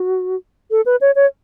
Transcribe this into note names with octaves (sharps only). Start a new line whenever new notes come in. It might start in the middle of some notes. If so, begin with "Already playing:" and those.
Already playing: F#4
A4
B4
C#5
C#5